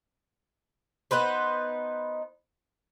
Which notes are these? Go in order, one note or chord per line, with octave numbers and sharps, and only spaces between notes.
B3 D#4 B4 C5